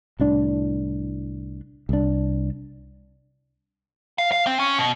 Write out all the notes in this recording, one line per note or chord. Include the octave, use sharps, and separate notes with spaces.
C2 A2 D4
C2 D4
F5
F5
C4
C#4
B2